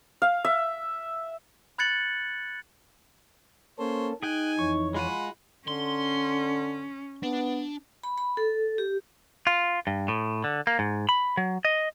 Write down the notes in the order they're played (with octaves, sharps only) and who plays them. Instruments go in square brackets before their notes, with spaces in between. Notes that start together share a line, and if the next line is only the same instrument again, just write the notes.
[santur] F5
E5
[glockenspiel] B5 F#6 G#6 A6 C#7 F#7
[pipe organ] A#3 C#4 A4 [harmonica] C5 C#5
[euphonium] D#4 [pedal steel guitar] G#4 G5 [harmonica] G#5 [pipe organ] F#6
[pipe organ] F2 E3 C#5 [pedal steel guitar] C#6
[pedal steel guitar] G#3 F4 G#5 [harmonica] F#5 B5
[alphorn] D3 [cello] C#4 [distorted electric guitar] C6
[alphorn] B3 [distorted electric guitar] D4
[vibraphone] B5
B5
A4
G4
[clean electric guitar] F4
G2
A2
D3
A#3
G#2
B5
F#3
D#5